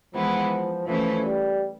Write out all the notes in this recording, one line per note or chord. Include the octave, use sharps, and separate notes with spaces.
E3 F3 G#3 B3 E4
E3 F3 A3 C#4 E4
G3